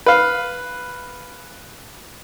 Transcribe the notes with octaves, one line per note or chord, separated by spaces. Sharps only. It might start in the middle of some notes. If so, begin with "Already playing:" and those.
B4 F5